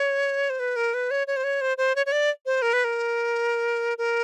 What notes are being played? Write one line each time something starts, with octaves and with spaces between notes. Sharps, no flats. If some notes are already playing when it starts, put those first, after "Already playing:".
Already playing: C#5
C5
B4
A#4
B4
C#5
C#5
C5
C#5
C5
C5
C#5
C#5
D5
C5
A#4
B4
A#4
A#4